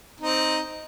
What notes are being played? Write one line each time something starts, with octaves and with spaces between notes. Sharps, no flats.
C4 D#4